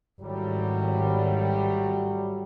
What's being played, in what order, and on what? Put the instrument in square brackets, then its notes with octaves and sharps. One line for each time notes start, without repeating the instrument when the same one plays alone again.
[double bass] G#1 [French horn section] A2 F#3 G3